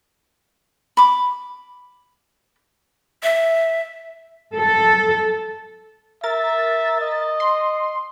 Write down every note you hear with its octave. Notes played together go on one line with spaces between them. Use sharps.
B5 D6
E5
A4
A#4 E5 A6
D#5
C6